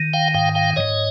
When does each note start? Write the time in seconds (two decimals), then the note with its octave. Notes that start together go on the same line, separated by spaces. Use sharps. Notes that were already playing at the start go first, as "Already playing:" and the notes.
Already playing: D#3
0.14 F5 G5
0.34 G#2 F5 G5
0.55 F5 G5
0.76 G#2 C#5 D#5